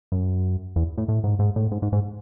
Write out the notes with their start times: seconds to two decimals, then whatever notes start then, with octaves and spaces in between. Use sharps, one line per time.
0.12 F#2
0.76 E2
0.98 A2
1.08 A2
1.24 G#2
1.39 G#2
1.56 A2
1.71 G#2
1.82 G#2
1.92 G#2